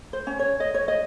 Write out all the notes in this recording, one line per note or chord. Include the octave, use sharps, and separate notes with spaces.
C5
C#4
C#5
D#5
C#5
D#5